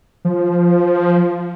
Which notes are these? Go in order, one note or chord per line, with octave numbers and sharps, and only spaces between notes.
F3